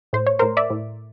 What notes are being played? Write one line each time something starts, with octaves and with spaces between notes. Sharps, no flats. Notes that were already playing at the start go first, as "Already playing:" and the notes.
A2 C5
C#5
A2 A#4 C5
D5 E5
A2